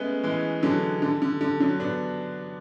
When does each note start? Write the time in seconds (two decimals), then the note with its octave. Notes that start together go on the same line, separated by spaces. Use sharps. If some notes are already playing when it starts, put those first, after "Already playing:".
Already playing: G#3 A3 B3 C#4
0.23 E3 G#3
0.62 D3 F#3
1.02 D3
1.22 D3
1.41 D3
1.60 D3 F#3
1.80 B3 D4